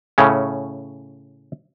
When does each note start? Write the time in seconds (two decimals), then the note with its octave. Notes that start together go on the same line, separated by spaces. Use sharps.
0.18 A2 C#3 C#4